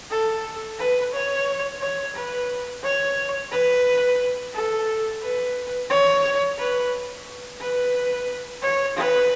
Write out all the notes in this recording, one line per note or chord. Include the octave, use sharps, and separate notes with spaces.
A4
B4
C#5
C#5
B4
C#5
B4
A4
B4
C#5
B4
B4
C#5
B4